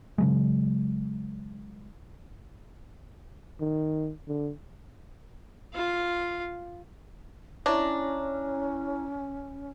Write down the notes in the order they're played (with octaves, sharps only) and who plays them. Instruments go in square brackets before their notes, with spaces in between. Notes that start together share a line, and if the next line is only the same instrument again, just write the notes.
[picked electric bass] C#3 F#3 G#3
[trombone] D#3
D3
[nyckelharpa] F4 F5
[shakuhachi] C#4 [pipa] D4 [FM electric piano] E4 C#5 A#5